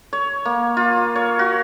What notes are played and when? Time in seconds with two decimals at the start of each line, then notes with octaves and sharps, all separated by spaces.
0.13 C#5
0.45 A#3
0.77 F4
1.16 C#5
1.39 F#4